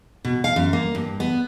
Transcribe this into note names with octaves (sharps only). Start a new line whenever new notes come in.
B2
F5
F#2
A#3
G2
B3